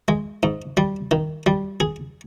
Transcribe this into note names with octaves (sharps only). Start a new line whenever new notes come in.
G#3
G#2
G3
D#3
G3
G#4